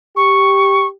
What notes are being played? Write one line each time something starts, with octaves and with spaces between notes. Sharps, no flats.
G4 C#6